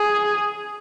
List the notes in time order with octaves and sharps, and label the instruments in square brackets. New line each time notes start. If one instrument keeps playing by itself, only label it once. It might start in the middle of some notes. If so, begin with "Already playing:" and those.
Already playing: [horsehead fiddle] G#4